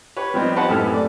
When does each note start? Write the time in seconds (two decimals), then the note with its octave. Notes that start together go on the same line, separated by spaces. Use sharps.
0.17 G4 B4 C#5
0.34 F3 G3 B3 C4 D#4
0.56 D#4 G4 B4 C5 F#5 A5
0.69 F#2 A2 A3 G4 A4 F6
0.94 D5